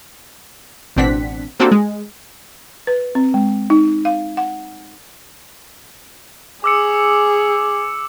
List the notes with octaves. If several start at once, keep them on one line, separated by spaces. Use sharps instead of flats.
A1 B2 C4 D4 F#5 B6
A#3 C4 D4 F#4 G4 A4
G#3
B4
C4
G#3
D#4
F5
F#5
G#4 D6 E6 C#7